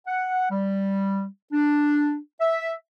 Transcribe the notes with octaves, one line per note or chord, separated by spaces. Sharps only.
F#5
G3
D4
E5